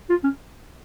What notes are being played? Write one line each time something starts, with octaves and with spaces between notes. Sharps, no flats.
F4
C#4